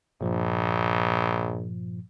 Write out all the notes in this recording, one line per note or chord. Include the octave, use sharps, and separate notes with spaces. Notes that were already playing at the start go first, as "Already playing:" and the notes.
A#1 G2 A#2 F3